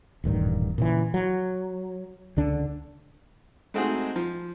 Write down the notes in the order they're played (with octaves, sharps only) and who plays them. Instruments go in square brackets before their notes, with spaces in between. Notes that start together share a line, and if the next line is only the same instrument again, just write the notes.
[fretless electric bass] D#1 A1 G2 D#3
A#2 C#3 E3
F#3
C#2 D3 D4
[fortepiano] G#3 A3 C4 D#4 F#4 G#4
F3